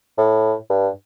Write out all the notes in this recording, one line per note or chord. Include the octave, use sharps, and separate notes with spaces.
A2
G2